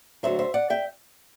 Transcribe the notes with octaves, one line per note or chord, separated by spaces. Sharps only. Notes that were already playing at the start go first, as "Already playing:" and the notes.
D2 D3 F#3 C5 E5
C5 E5
D5 F#5
E5 G5